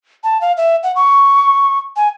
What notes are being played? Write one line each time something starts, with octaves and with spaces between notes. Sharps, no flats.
A5
F5
E5
F#5
C#6
G#5